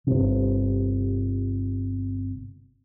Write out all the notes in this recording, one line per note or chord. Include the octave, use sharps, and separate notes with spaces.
G1 C3